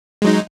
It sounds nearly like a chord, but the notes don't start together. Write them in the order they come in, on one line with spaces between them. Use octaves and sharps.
G#3 F#3 D#4